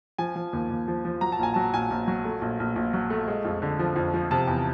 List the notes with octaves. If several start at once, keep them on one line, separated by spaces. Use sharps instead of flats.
F3 G#5
F3
D#2
D#2
F3
F3
F#3 A#5
A5
A#1 G#5
F#3 A5
A#1 G#5
A#1
F#3
A3
A#1
A#1
A#1
F#3
A3
G#3
F2
D3
F3
F2
F3
C3 A5
E2